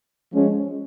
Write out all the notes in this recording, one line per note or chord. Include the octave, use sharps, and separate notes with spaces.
F3 G#3 C#4